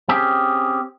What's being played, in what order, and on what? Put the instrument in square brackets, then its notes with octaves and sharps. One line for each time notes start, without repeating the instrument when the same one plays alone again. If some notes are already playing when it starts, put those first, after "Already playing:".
[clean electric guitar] C4 C#4 G4 G#4